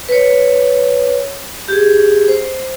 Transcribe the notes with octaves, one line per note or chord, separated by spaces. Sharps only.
B4 C#5
G4 G#4
C5